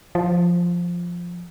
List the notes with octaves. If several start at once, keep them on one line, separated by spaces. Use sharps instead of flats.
F3